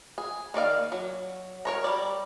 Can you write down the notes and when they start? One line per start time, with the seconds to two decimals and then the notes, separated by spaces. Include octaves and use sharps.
0.18 G#4
0.54 D#3 A#3 D5 F5
0.92 F#3
1.65 A#4 C#5 A#5
1.84 G3 D5